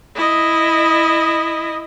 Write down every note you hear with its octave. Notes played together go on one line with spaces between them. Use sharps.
E4 D#5